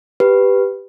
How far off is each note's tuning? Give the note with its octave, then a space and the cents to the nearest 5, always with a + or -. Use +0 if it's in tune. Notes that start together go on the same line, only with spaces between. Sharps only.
G4 +0 B4 +0